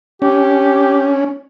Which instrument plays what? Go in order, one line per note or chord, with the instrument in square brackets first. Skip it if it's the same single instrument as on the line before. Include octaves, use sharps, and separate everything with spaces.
[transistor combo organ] C#4 [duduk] G4